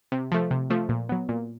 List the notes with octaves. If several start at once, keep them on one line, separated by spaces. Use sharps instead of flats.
C3
F3 A3
C3
F3 A3
A#2
F#3 B3
A#2